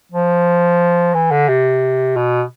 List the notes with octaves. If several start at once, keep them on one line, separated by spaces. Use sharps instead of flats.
F3
E3
D3
C3
B2